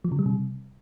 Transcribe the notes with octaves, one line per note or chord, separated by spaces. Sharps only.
F3
C#3
G3
C3